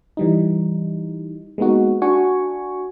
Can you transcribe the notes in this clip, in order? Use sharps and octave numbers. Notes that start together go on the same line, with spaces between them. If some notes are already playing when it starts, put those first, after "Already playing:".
E3 G3 D#4
G#3 A#3 B3 D#4 F#4
D4 F#4 G#5 C#6